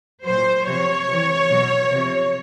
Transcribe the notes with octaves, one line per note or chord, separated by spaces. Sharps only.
A#2 F#3 C5
C3 F3 C#5
C3 E3
B2 F#3
C3 F3